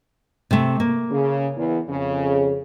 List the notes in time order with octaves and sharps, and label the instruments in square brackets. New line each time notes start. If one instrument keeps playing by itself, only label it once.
[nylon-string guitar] C3 A3
A#3
[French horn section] C#3
E2
F2 C#3